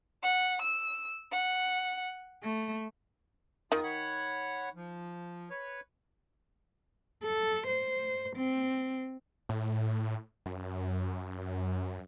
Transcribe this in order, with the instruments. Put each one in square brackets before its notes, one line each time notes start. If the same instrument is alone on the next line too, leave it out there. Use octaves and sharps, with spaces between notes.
[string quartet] F#5
E6
F#5
A3
[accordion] E2 F4 D#6 [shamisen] D#3
[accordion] C#5 F#5 B5
F3
B4 C#5
[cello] A4
C5
C4
[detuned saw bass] A2
F#2